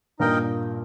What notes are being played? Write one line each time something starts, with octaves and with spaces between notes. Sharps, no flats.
G2 A#2 D#4 A#4 D#5 G5